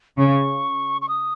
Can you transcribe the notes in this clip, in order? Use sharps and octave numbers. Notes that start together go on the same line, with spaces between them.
C#3 C#6
C#6
D#6